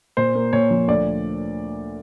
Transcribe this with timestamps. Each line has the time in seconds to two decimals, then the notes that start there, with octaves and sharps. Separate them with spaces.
0.17 A#2 C5
0.35 A#3
0.53 A#2 C#5
0.71 F3
0.88 D2 D5